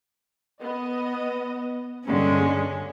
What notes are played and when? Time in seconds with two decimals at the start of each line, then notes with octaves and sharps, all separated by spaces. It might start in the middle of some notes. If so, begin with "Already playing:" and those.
0.61 B3 D#5
2.06 G2 D3 G#3 C#4